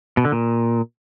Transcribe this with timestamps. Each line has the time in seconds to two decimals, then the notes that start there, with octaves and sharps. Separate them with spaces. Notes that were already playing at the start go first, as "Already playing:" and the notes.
0.17 B2
0.25 D3
0.32 A#2